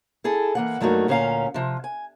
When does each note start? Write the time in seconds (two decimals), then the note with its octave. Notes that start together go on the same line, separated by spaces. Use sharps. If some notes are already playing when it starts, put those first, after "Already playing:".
0.24 E4 G#4 A4
0.55 E3 A#3 F#5
0.81 G2 F#3 A3 A#3 D#4 F#4
1.08 D2 A#2 C#4 D5 F5 A#5
1.54 C3 F3
1.84 G#5